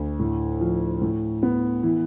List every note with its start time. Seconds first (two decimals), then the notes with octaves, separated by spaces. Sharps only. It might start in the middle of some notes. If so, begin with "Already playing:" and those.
Already playing: D2
0.19 A2
0.61 F3
1.02 A2
1.43 B3
1.83 E3